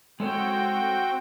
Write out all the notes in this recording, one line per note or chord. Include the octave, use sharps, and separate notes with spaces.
G#3 C4 F#4 A4 C#5 G5